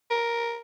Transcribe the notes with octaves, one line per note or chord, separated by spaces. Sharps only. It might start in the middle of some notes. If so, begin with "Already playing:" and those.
A#4